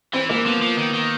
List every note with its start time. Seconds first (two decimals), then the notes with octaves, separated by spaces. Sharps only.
0.13 E3 C4
0.29 E3 A#3
0.45 F3 B3
0.62 F3
0.78 D#3
0.94 D#3